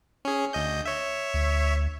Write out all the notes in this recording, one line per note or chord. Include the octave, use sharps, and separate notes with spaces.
C#4 G#4
D2 D#5 G6
C#5 E5
D2